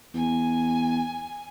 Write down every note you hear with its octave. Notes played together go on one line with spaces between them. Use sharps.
E2 G#5